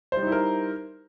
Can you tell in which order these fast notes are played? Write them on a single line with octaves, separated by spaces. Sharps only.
C5 G3 D#4 E4 A#4